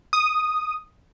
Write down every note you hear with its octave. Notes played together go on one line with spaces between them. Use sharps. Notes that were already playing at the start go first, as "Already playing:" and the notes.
D#6